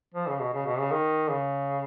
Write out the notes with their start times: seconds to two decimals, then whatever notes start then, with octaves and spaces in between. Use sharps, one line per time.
0.14 F3
0.28 C#3
0.41 B2
0.53 C#3
0.66 B2
0.79 C#3
0.92 D#3
1.30 C#3